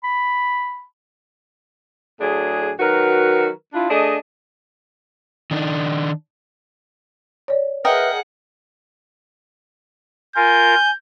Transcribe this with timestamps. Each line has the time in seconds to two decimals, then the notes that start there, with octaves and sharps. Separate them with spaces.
0.04 B5
2.20 A2 F#3 D4 G#4
2.80 D#3 F#3 F#4 A#4 B4
3.74 D4 E4 F4
3.89 A3 D4 G#4 D#5
5.51 D#3 D4 D#4
7.48 C#5 D5
7.85 G#4 A#4 B4 D#5 E5 F#5 G5 F6
10.36 F4 A#4 G#5 G6